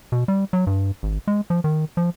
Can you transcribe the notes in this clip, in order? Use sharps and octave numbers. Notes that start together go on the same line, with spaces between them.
B2
G3
F#3
G2
G#1
G#3
F3
D#3
F3